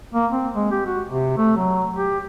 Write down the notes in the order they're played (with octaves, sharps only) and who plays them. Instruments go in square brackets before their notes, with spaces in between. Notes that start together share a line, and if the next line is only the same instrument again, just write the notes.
[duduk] A#3
C4
G#3
G4
F#4
C3
A3
F#3
G4